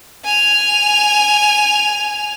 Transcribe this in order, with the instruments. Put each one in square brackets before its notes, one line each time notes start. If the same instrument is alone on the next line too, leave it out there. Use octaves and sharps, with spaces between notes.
[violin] G#5 F7